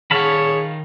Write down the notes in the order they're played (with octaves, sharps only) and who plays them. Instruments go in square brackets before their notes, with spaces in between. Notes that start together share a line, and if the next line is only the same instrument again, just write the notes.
[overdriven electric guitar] D#3 F#5 [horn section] G#4 C#5 [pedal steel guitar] F5 A5 B5